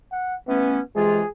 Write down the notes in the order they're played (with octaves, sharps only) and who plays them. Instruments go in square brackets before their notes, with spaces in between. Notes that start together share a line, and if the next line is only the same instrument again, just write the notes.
[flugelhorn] F#5
[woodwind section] E3 A3 C#4 [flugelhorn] B3
[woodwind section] C3 E3 F4 [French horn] G#3 [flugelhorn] G#4